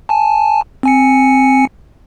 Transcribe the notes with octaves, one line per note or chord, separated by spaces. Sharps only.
G#5 A5
C4 G#5 C#7